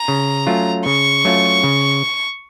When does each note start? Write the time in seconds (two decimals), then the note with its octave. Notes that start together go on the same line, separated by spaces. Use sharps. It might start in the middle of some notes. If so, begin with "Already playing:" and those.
Already playing: A#5
0.08 C#3
0.47 F#3 A3 C#4 F4
0.86 C#3 C#6
1.25 F#3 A3 C#4 F4
1.63 C#3